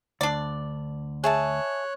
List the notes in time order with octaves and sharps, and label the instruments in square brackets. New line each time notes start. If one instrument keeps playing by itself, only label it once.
[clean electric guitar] D2 [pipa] D4 D5
[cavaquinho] G#4 E5 A5 [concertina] C#5 F#6